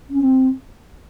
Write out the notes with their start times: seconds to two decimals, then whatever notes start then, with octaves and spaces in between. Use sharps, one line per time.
0.09 C#4
0.20 C4